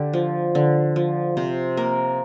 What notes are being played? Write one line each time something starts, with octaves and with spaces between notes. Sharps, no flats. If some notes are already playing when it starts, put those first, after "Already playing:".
Already playing: D3 G4
F3
D3
F3
C3 C5
A#3 A#4